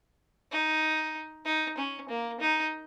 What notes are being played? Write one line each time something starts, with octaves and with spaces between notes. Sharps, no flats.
D#4
D#4
C#4
A#3
D#4